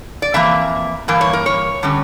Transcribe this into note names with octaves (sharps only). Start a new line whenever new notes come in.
D5
F2 E3 A#3 E5
G2 E3 A#3
C#5
A#4
C#5
D3 G3 C#4